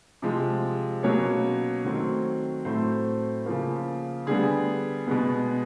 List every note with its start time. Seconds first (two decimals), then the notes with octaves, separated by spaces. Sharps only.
0.22 C3 F3 G#3
1.03 B2 F#3 A#3 C#4 C#5
1.85 D#3 F#3 A3 C4
2.65 A2 F#3 A3 C4 C5
3.46 C#3 F3 A#3
4.27 D3 G3 B3 G#4
5.07 B2 G#3 B3